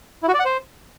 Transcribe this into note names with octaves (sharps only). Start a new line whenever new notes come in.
E4
F#4
D5
F#5
C5